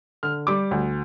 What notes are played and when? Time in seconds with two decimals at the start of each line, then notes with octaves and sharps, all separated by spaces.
0.23 D3 F6
0.47 G3 D6
0.71 D2